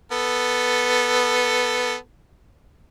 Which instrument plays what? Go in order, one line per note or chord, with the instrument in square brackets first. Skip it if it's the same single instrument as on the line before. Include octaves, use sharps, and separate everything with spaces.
[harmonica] B3 A4